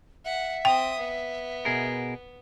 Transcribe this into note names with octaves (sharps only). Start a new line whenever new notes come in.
E5 F#5
C4 G5 D#6
B3
B2 G#4 A#4